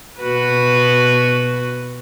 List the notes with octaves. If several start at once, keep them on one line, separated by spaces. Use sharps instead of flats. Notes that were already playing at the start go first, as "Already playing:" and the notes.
B2 F#4 B4